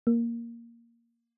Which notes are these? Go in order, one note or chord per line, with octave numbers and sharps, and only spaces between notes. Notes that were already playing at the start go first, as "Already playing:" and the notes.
A#3